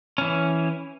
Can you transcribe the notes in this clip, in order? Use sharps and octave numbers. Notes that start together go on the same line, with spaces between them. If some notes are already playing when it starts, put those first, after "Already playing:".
E3 C#4